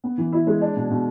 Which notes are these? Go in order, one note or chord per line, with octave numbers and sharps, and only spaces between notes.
B3
E3
E4
G#3
D4
B2
B2